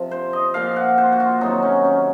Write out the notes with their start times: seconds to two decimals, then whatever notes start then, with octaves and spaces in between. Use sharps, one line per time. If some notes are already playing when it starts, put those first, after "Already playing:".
Already playing: C3 F3
0.11 C5
0.33 D#5
0.54 A#2 F3 F5
0.76 F#5
0.98 C5
1.12 F#4
1.20 F4
1.41 C3 D#3 F#3 D#4
1.63 C#4
1.84 C#4